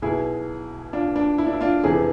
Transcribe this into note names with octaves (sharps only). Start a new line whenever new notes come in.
B1 B2 E4 G#4
D4 F4
D4
E4
D4
E4
D4 F4
F1 E2 C3 E3 E4 G#4